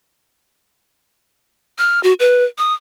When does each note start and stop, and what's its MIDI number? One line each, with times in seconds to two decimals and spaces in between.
1.78 2.02 89
2.03 2.13 66
2.20 2.45 71
2.58 2.74 87